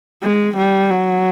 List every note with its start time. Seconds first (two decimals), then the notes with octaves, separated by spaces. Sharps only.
0.23 G#3
0.57 G3
0.90 F#3